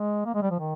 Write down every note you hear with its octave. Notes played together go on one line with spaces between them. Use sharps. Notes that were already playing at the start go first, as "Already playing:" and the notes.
Already playing: G#3
A#3
G#3
G3
F3
D#3